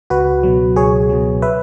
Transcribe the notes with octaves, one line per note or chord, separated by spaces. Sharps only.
C#2 F#4 B4
B2 F#3
C#2 G#4 C#5
B2 F#3
B4 E5